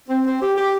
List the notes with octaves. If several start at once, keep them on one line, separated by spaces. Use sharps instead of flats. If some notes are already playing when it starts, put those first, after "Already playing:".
C4
C4
G4
G4